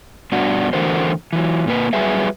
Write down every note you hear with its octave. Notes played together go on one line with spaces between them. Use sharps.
G2 B2 D4 F#4
D3 E3 A3 F#4 A#4 C5
E3 F#3
A#2 A#3 B4
F#3 G3 G#4 B4 E5